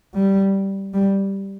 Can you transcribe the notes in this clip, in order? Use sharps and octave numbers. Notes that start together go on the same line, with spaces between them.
G3
G3